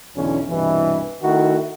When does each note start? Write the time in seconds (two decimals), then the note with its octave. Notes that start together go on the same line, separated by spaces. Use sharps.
0.16 B1 E2 D3 E3 C#4
0.49 C2 G2 B2 E3
1.23 D#3 A3 E4 F#4